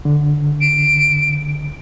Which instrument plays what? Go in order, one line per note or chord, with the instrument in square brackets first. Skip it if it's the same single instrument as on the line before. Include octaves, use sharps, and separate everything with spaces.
[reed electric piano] D3
[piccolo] D7